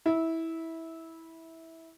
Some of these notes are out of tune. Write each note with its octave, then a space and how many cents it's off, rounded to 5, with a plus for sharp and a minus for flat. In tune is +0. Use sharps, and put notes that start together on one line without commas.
E4 -15